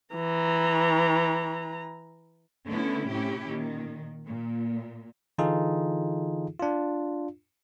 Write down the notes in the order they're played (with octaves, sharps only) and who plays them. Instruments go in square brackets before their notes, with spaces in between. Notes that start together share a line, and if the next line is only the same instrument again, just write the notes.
[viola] E3 A#5
[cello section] D3 A3 B3 C#4 E4
A2 C3 C#4 E4 G4
A#2 D#3
A#2
[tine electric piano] D3 E3 D#4 F4 G#4 A4
D4 F4